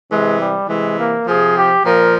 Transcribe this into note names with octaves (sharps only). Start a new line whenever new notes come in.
C3 E3 G#3
G3
C3 E3 G#3
A#3
C3 F3 G#4
G4
A#2 F3 A#4